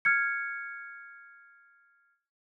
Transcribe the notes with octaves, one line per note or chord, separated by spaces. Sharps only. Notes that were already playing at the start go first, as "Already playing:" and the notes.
F6 G#6 C#7